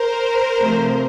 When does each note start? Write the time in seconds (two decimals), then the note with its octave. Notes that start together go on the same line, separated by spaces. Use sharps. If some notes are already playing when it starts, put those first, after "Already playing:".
Already playing: A#4 C5
0.61 C3 F3 A3